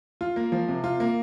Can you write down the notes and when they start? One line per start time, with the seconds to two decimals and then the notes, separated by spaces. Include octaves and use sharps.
0.21 F4
0.36 A#3
0.52 F3
0.68 C3
0.84 F4
1.00 A#3